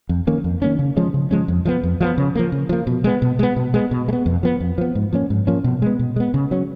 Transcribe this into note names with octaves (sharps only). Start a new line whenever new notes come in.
F2
D#3 A#3 C#4
F2
D#3 A#3 C#4
C#3
F3 G#3 C#4
C#3
F3 G#3 C#4
F2
F3 G#3 B3
F2
F3 G#3 B3
C#3
F3 A#3
C#3
F3 A#3
B2
G#3 B3
B2
G#3 B3
B2
G#3 B3
B2
G#3
B3
F2
F3 B3
F2
F3 B3
G#2
F3 A#3 C#4
G#2
F3 A#3 C#4
B2
G#3 B3
B2
G#3 B3
C#3
F#3 C#4